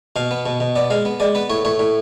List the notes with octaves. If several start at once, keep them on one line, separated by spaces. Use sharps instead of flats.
B2 F5
B3
B2
B2
B3 D5
G#3 F5
B3
G#3 D5
B3 B4
A2 C#5
A2 C#5
A2